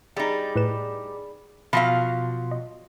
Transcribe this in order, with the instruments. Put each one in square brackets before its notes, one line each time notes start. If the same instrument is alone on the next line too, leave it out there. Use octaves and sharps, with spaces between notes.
[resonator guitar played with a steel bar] G3 D#4 [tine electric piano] G#4 D5 B5
[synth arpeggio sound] A2 B4 E7
[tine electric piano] B2 C6 [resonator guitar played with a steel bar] F3 F#3 F5 [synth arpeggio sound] B5 A#6
[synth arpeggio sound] D#5